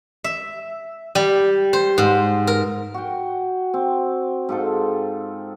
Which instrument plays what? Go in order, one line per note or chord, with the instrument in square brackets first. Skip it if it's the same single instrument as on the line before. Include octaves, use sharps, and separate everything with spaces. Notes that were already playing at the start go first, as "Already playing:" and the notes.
[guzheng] E5
G3
C5
G#2
A#4
[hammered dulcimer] F#4 G5
C4
G#2 F4 A4